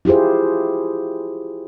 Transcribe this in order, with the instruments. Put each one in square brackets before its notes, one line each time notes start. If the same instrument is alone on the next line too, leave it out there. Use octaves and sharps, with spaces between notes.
[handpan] E4 F4 G4 G#4 C5